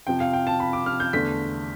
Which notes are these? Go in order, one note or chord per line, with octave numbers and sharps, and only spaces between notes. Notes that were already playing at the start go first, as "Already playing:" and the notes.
F2 C3 F3 G5
F5
G5
A5
B5
D6
F6
G6
E2 D3 A3 D4 B6